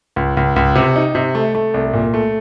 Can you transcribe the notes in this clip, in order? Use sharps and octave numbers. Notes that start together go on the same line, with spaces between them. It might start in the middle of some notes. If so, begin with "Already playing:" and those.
C#2
C#2
C#2
C3
D#4
C3
A3
A3
C2
A#2
A3